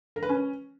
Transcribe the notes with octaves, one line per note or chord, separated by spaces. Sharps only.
A#4
B4
C#4